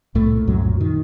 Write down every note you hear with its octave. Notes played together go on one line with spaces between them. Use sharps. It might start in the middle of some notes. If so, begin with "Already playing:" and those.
C2 A2 A3
A#2
C2 F#2 F#3
A#2
D#3